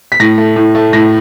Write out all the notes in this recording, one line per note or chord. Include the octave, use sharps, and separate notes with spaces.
B6
A2 A#6
A3
A2
A3
A2 A#6